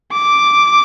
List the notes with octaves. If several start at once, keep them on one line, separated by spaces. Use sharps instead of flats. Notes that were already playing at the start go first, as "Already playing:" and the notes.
D6